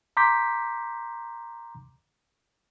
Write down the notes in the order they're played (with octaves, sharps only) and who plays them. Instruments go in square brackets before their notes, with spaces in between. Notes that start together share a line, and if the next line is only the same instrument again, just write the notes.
[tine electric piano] A#5 C6 D6 G6 B6